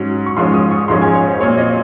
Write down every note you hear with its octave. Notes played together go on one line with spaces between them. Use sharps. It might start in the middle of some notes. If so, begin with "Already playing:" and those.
Already playing: G#2 F#3 C#4
C#6
G#2 F3 G#3 C#4 C6
D#6
C#6
G#2 F3 G#3 C#4 C6
G#5
C#5
C5
A#2 F#3 C4 C#5
D#5